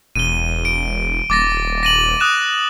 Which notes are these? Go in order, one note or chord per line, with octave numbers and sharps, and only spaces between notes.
E1 D#7 G7
D7
D#1 D6 A6 A#6
A#6 D#7 F#7
D#6 F#6 E7